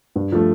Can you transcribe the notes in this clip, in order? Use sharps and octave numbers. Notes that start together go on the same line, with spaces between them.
G2
F3 A3